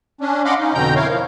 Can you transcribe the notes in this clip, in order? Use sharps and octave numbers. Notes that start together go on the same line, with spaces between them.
C#4 D4
D#5 F5 F#5 B5 C6 D6
C#4 D#4
F2 B2 D3 G5 A#5 G6
E4 A#4 C#5 F5
F3